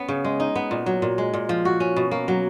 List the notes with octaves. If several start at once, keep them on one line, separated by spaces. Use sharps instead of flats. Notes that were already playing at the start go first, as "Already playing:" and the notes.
Already playing: B3 C#4
C#3
G#3
D#4
B3
A#2
F#3
A#2
G#3
A#2
F3
F#4
C#4
B2
A#3
F#3